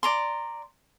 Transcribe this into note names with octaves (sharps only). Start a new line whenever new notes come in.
D5 A#5 C6